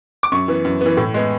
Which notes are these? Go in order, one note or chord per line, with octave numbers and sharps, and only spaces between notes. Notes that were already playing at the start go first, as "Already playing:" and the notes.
D6
F#2 C#6
E3 B3
F#2
E3 B3
A2
G#3 B3